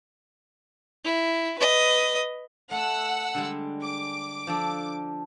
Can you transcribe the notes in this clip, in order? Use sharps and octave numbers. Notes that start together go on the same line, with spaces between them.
E4
B4 D#5
A3 F#5 E6
D3 G3 G#3
D6
F3 D4 A4